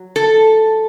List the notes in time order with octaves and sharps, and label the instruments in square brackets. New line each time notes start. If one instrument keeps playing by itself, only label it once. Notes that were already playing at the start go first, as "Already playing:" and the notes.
Already playing: [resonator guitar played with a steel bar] F#3
A4